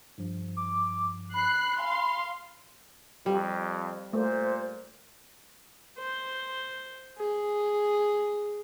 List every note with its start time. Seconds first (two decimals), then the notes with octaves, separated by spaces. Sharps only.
0.18 G2 F3
0.57 D6
1.34 B5 F#6 C7
1.79 F5 G#5 C6
3.26 F2 G3
4.13 A#2 A3 C5
5.98 C5
7.18 G#4